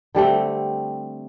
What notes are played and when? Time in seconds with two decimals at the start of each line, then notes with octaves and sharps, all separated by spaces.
0.15 D3 G3 A3 C4